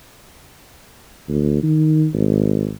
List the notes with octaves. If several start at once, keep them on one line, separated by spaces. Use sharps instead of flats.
D2
D#3
G#1